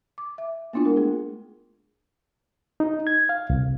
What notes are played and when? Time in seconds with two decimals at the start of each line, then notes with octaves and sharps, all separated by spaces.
0.18 D6
0.38 E5
0.73 A#3 B3 D4 E4 F4
0.85 G#3 A#4
0.97 A3 G#4
2.80 D#4
3.07 G#6
3.29 F5
3.50 C2